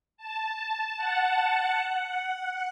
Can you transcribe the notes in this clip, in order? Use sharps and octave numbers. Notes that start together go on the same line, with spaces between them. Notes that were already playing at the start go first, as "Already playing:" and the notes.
A5
F#5
F#5